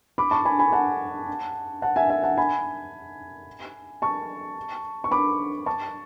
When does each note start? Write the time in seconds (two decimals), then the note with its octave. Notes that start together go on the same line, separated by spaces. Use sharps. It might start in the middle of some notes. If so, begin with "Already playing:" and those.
0.18 B5 D6
0.31 A5 C#6
0.45 G#5 B5
0.59 G#5 B5
0.72 F#5 A5
1.82 F#5 A5
1.96 E5 G#5
2.10 E5 G#5
2.23 F#5 A5
2.38 G#5 B5
4.02 A5 C#6
5.04 C#6
5.11 B5 D6
5.66 A5 C#6